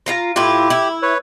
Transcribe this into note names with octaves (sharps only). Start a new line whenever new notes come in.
F4 F5 A#5
A2 E4 F4 G4
E4
B4 C#5